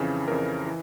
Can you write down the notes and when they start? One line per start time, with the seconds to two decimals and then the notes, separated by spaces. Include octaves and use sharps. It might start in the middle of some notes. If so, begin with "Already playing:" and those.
Already playing: F2 C#3 E3
0.27 F2 C#3 E3 A#4
0.66 E3